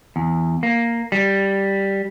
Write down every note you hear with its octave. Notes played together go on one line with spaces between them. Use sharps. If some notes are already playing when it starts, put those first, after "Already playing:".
E2
A#3
G3